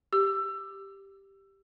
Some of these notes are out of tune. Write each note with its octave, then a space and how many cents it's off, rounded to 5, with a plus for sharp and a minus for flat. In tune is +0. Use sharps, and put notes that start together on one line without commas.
G4 +0 E6 +20